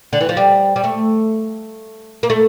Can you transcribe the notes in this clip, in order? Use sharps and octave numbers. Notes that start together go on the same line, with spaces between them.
D3
E3
F3
G3
G3
A3
A#3
A3